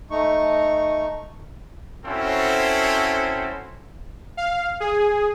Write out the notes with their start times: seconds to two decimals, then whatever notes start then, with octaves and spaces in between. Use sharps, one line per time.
0.11 A3 D#4 C#6
2.06 C4 C#4 E4 F#4 A4 C5
4.37 F5
4.80 G#4